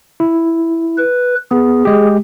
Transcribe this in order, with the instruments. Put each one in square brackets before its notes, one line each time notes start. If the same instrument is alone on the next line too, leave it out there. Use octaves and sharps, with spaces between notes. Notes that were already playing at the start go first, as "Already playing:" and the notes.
[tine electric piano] E4
[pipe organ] B4
[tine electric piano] B3 [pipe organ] G#4
[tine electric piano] G#3 G4